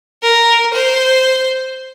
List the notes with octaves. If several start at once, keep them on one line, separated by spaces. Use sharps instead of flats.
A#4
C5